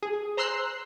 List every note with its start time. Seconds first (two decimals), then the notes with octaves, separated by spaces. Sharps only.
0.03 G#4
0.37 C5 A#5 C6 E6 F#6 C7